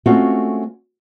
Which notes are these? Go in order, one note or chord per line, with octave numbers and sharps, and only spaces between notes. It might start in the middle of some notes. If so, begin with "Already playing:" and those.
G#3 A3 C4 C#4 F4 F#4